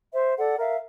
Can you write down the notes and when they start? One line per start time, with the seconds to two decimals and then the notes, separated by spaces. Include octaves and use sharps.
0.14 C5 E5
0.38 A4 D5 F#5
0.59 A#4 E5 F5